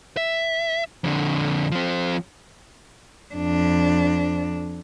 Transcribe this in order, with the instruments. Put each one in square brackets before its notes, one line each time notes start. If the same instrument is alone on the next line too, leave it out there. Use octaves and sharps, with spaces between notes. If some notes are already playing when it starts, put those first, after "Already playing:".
[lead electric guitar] E5
F2 D3
F3 C4
[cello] F2 D4